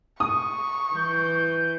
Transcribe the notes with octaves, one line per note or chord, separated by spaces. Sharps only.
C#6 D#6
E3 G6